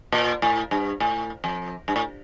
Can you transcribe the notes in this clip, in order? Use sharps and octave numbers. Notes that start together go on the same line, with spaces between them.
A#2
A2
G2
A2
F2
G2
A2